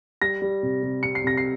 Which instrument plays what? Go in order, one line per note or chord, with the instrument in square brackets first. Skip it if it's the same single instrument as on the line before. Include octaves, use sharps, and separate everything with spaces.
[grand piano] G3 A#6
G3
C3
C3
C3 C#7
C7
C3 A#6
C7